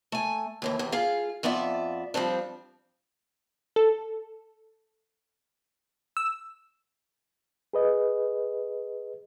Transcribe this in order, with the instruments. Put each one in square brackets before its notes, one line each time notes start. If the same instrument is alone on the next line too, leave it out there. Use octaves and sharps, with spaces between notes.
[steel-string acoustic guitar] A3 G#5
D#2 A2 E3
E2 C3
F4 G#4 F5
F2 B3 F4 D5 E5
F3 G3 C4 D4
[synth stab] A4
E6
[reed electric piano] G#4 B4 D#5